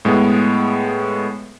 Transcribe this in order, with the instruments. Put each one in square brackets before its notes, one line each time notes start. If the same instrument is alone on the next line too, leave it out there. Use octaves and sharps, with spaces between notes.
[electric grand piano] A2 G#3 B3